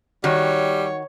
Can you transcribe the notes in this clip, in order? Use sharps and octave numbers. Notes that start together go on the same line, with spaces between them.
D#3 G3 F#4 C#5